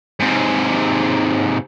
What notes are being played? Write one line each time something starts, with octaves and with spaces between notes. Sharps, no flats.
G#2 C3